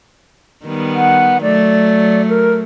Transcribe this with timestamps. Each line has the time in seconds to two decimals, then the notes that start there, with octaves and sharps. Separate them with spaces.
0.65 D#3 G3 B3
0.95 F#5
1.42 F#3 A3 D5
2.29 A#4